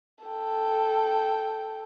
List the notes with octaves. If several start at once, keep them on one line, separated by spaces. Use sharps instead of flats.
A4 G5